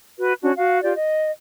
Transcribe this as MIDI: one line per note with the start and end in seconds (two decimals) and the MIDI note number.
0.18 0.33 66
0.18 0.33 71
0.42 0.51 61
0.42 0.51 62
0.42 0.51 66
0.57 0.82 66
0.57 0.82 77
0.82 0.94 65
0.82 0.94 67
0.82 0.94 74
0.96 1.30 75